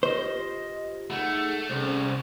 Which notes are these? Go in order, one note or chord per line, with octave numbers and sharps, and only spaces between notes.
F4 G4 C5 D#5
A3 D#4 G#4 F#5
C2 C4 C#4 G#4 C5